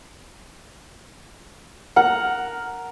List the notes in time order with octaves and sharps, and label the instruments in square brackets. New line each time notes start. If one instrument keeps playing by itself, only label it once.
[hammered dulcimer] A#4 [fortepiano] F#5